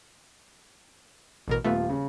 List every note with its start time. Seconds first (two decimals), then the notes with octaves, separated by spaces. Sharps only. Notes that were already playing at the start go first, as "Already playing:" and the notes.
1.48 A1 B2 A#4
1.64 D#1 A3 B3 F4
1.89 C#3